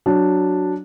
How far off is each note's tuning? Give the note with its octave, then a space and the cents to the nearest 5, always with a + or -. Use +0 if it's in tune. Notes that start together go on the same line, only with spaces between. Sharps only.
F#3 +0 D4 +0